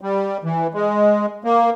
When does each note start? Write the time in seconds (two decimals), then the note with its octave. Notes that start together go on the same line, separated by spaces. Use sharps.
0.01 G3
0.44 E3
0.74 G#3
1.44 A#3